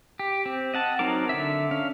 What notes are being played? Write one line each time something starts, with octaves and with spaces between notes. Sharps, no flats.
G4
C4
D#5 F#5 A5
F#3 C4 D#4 A#4 D6
D3 E5
C#4 F5